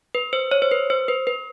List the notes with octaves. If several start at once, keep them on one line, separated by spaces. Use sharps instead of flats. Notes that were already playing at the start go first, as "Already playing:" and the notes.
B4
C5
C#5
C5
B4
C5
B4
B4